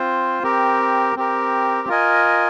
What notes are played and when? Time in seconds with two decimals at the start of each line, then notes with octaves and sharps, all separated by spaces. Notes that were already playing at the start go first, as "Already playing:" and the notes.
Already playing: C4 F4 C5
0.43 C4 G4 A#4
1.16 C4 G4 A#4
1.88 F4 A#4 D#5 G#5